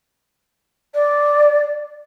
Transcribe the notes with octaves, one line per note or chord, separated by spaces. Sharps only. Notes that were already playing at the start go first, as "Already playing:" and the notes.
D5